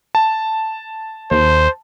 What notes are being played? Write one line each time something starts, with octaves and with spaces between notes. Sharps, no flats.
A5
D#2 C5